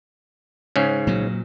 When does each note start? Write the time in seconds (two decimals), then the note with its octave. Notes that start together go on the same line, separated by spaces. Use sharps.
0.76 G#2 C#3 C#4
1.07 A#2 F#3